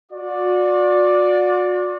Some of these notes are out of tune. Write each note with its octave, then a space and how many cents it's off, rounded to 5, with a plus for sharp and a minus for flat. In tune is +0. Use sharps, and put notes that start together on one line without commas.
F#4 -40 D5 +0